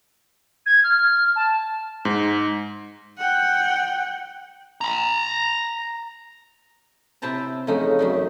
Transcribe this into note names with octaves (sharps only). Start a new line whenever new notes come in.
G#6
F6
A5
G#2
F#5 G5
A#5 B5
C3 E4 C5 G5 A5 A#5
F2 C#3 A3 D#4
F#2 G3 D#4